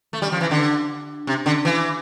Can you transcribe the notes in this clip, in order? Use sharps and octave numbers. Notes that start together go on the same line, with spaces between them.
A3
G3
F3
E3
D3
C3
D3
E3